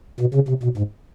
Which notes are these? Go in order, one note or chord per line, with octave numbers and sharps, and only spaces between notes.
B2
C#3
C3
B2
G#2